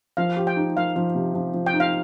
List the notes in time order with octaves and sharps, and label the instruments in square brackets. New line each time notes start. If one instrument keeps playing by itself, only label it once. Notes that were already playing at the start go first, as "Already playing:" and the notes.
[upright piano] F3 [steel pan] F5
[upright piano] G4
[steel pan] G5
[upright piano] D#4
[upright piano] F3 [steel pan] F5
[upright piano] F3
C3
F3
F3
[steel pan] G5
[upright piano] D#4
[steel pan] F5